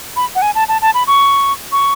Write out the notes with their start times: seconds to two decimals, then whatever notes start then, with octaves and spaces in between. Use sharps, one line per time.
0.16 B5
0.35 F#5
0.42 G#5
0.55 A5
0.68 A5
0.82 A5
0.94 B5
1.07 C#6
1.72 C#6